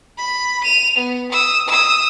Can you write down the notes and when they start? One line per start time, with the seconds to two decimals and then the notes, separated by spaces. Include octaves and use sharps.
0.18 B5
0.64 D#7 F7
0.96 B3
1.32 D#6 E6
1.69 D#6 E6